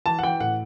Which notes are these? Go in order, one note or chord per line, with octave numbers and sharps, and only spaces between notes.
E3 A5
F#5
E3 G5
A2 F#5